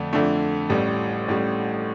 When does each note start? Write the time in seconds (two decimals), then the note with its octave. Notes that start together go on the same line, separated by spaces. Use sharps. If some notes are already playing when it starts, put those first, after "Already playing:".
Already playing: F2 D3 A3 D4
0.13 F2 D3 A3 D4
0.69 A1 A2 G3
1.28 A1 A2 G3